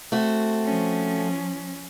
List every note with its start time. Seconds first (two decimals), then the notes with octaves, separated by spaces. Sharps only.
0.12 A3 C4 F#4
0.65 F3 C#4